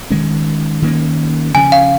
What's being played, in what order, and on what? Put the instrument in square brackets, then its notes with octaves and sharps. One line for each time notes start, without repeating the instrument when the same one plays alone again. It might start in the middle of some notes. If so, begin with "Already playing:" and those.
[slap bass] D#3 G#3 C#4
D#3 A#3 C#4
[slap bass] C#3 F3 C#4 [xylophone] G#5
[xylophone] F5